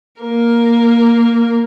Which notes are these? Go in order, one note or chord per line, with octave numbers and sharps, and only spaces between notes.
A#3 A#4